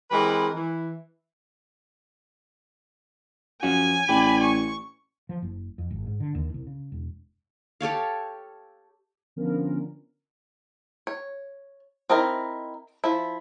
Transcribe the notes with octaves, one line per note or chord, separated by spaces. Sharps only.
E3 G#3 C4 G4 A#4 B4
E3
F#2 F3 C#4 F#4 G#5
A1 G4 D5 B5
C#6
F3
F#1
F2
G#1
G#2
D3
D#2
C2
C#3
E1
G4 A4 C#5 F5
D3 F3 B3 C#4 A#4
C#5
C4 D#4 E4 A#4 D#5
F3 E4